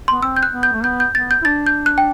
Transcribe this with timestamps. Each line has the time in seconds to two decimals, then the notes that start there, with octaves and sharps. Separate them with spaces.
0.08 C6
0.12 B3
0.22 C4 E6
0.37 G6
0.43 F#6
0.53 B3
0.63 G6
0.72 A3
0.84 B3 G6
1.00 G6
1.15 B3 A6
1.31 G6
1.42 E4
1.45 D4 A6
1.66 G6
1.86 F#6
1.98 G5